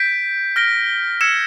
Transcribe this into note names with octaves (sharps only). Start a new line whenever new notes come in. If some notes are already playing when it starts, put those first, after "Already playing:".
Already playing: G6 B6 D7
F6 A#6 D7 G7
E6 G#6 C#7 E7